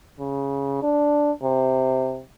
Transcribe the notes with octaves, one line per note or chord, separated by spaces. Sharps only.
C#3
D4
C3